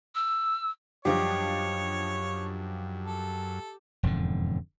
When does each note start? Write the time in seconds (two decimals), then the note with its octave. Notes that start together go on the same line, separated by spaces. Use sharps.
0.15 E6
1.05 F#2 F3 G3 D4 G4 C#5 D#5
3.07 A4
4.03 E1 F2 G#2 D3